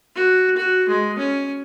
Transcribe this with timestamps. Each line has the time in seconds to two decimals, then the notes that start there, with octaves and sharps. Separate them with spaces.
0.15 F#4
0.56 F#4
0.89 G#3
1.18 C#4